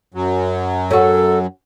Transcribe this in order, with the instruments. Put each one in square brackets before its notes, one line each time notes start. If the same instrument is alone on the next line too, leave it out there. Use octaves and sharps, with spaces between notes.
[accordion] F#2 F#3
[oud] C#4 F#4 [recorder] A4